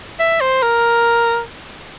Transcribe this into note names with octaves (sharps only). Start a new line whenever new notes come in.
E5
C5
A#4